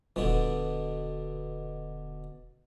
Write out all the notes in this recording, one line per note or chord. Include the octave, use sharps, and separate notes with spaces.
D#1 B2 D3